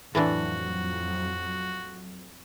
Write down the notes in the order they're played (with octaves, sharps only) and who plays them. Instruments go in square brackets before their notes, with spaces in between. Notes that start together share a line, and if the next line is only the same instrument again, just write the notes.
[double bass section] F2 F#3 [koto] A2 E3 D4 [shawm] F#4